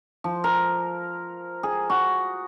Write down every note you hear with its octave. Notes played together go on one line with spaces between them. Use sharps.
F3
A#4
G#4
F#4